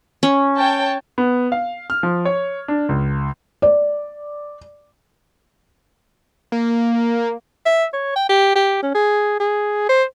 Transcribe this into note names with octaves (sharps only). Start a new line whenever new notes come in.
C#4
C#5 G5 A5
B3
F5
F6
F3
C#5
D4
C#2
D5
A#3
E5
C#5
G5
G4
G4
C#4
G#4
G#4
C5